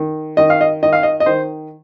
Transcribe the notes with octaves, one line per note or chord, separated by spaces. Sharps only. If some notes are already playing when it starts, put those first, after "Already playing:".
Already playing: D#3
D#3 D#5
F5
D#5
D#3 D#5
F5
D#5
D#5
D#3 C5